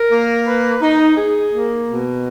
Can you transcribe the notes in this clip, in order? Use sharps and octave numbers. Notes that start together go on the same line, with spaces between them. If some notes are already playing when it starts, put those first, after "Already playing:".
Already playing: A#4
A#3
B4
D#4
G#4
A#3
B2